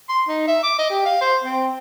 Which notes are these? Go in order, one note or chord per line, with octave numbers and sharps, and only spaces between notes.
C6
D#4
E5
D6
D#5
G4
F5
C5
C4